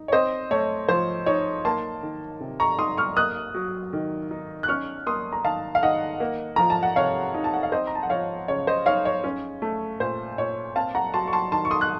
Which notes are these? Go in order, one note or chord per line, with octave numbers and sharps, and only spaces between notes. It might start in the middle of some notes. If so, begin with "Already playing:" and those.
Already playing: D#4
C#5
C4 C5 D#5
A3 C#5
F3 C5
D#4 C#5
A#3 A5 C6
D#3
C3
A#5 C#6
D#4 C6 D#6
C#6 F6
A#3 D#6 F#6
F#3
D#3
D#4
F#6
C#4 C#6 F6
A#3 C6 D#6
A#5
D#3 F5 A5
F5
D#3 D#5 F#5
A#3
F3 A#5
A5
F#5
C3 C#5 F5
D#4
A5
F#5
F5
C4 C5 D#5
A#5
A5
F#5
F3 C#5 F5
C#3 C#5
C5 D#5
D#4 C#5 F5
C#5
C#4
A3
A#2 C5
A#2 C#5
C4 F5 A5
F#5 A#5
F#3 A5 C6
C#6
A5 C6
D#3 A5 C6
C#6
C6 D#6
F#6